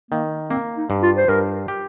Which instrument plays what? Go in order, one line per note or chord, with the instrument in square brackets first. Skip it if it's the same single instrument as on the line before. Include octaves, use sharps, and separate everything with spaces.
[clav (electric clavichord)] D#3 [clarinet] A#3
[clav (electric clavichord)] A#3 [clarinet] C4
[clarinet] D#4
[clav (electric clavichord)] G2
[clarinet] F4
C5
[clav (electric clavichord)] G2 [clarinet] A#4
[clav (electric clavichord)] G4